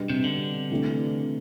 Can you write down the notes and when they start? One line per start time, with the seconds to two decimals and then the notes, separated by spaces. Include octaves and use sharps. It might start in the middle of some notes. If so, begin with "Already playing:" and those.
Already playing: B2 G3 D4
0.10 C3
0.24 D3
0.71 C3 E3 A3 D4